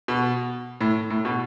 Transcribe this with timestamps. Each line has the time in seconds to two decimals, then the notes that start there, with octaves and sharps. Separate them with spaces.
0.08 B2
0.81 A2
1.10 A2
1.25 B2